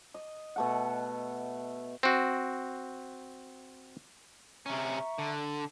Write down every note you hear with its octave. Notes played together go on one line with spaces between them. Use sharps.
D#5
B2 A3 F#5
C4 F#4
C3 C#4 E5 A#5 C#6
D3